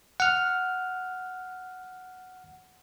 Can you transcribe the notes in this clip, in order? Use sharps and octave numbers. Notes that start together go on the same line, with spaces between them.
F#5 F6